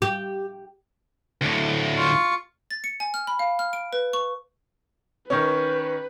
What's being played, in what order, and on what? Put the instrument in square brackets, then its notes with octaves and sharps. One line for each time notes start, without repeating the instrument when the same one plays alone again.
[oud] G4
[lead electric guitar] D2 A2
[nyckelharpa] F4 C#6
[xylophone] A6
C#7
G#5
F6
B5
F5
F6
D7
B4
C#6
[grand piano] D#3 C#4 [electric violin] B4